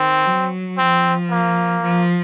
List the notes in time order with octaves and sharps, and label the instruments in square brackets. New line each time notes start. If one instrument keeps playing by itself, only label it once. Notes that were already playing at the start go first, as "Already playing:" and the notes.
Already playing: [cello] D#3 [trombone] C4
[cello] F#3
[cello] F3 [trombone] C4
[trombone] A#3
[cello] F3